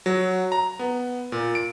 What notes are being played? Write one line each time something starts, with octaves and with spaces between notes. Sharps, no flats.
F#3
A#5
B3
A#2
D7